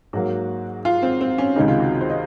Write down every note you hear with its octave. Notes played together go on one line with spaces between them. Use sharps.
G#2 F#3 A#3 F#4
F4
C4
C4
C#4
C#2 C3 D#3 G#3 D#4
F4
F#4
C5
D#5